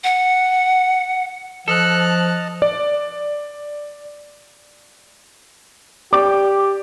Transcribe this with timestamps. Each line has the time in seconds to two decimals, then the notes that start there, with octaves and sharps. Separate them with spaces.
0.04 F#5
1.68 F3 A4 D#5 A5 F6 F#6
2.62 D5
6.13 G4 D5 D6